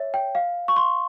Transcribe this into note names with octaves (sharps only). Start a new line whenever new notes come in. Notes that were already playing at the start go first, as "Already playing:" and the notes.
Already playing: C#5 E5
G5
F5
C#6
C6